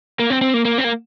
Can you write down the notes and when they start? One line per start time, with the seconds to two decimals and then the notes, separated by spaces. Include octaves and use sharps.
0.19 A#3
0.30 C4
0.41 C4
0.54 A#3
0.65 A#3
0.78 C4
0.84 A#3